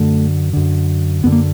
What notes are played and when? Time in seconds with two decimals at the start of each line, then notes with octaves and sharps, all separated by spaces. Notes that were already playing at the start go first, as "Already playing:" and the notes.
Already playing: F#2 D3 A3
0.53 F#2 D3
1.24 F#2 D3 B3
1.32 A#3